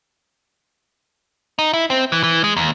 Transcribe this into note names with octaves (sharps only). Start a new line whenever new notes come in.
D#4
E4
C4
E3
E3
G#3
D#2